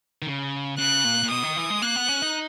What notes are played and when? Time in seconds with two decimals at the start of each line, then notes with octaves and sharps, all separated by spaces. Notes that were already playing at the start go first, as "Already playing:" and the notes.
0.22 D#3
0.27 C#3
0.78 C#3 F#6
1.04 A#2
1.23 A#2
1.31 B2 D#6
1.43 D#3
1.57 E3
1.70 G#3
1.82 A#3 F#6
1.96 B3
2.08 C#4
2.22 D#4